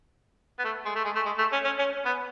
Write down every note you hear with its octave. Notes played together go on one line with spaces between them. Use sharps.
B3
A3
G#3
A3
G#3
A3
G#3
A3
C#4
C#4
C#4
B3